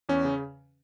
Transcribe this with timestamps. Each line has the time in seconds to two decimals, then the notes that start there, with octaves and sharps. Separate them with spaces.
0.09 E2 C#4
0.25 C#3